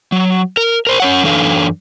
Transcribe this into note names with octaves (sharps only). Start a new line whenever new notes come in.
F#3
A#4
A#4 C5
C#4 C#5 F#5
F#2 E3 D4 A4 F5